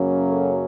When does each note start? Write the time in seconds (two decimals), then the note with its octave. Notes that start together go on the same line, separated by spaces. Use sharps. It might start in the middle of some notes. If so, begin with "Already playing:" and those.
Already playing: F#2 C#3 F#3 A#3 C#4
0.29 A4